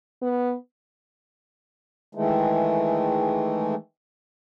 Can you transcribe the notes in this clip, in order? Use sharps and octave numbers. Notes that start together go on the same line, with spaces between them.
B3
D#3 E3 G#3 A3